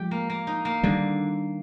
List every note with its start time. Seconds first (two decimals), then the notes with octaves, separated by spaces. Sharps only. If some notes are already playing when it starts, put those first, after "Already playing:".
Already playing: F3 G#3 G4
0.11 A#3
0.30 A#3
0.47 D#4
0.65 A#3
0.83 D3 D#3 G3